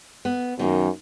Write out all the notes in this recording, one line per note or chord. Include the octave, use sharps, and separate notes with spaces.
B3
F#2 D#3 A#3